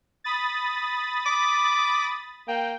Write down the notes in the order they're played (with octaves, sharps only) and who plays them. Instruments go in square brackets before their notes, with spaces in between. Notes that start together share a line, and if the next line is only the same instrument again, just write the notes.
[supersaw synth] B5 D#6 A6
[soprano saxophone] D6
[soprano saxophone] A#3 [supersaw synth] G5